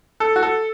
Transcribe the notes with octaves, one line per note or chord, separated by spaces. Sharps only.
A4
F#4
A4